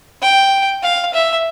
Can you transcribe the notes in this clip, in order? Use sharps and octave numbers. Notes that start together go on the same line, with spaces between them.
G5
F5
E5